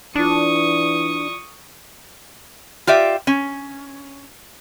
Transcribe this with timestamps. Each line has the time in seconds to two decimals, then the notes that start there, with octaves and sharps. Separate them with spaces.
0.16 E3 D4 F4 D5 C#6 D#6
2.87 F4 G4 D5 E5
3.27 C#4